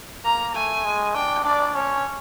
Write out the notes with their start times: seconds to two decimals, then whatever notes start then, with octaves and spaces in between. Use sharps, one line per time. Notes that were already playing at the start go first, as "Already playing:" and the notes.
0.25 A#3 A#5
0.55 A3 G#5
0.85 G#3
1.15 D4 G5
1.45 D4 D5
1.75 C#4 C#5